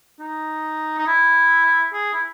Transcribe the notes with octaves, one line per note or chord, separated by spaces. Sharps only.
D#4
D#4
E4
G#4
E4